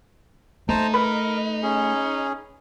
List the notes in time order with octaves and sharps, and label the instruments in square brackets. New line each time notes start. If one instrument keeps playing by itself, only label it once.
[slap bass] A3 [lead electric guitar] D#4 [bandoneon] C5 A5 A#5
[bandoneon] A#4 [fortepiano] B4
[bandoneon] C#4 G#4